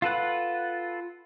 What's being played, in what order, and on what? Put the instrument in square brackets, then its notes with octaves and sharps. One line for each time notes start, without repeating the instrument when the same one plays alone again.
[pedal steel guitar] F4 A4 B4 F#5